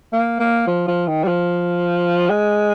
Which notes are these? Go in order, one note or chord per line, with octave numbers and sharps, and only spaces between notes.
A#3
A#3
F3
F3
D#3
G3
F3
G#3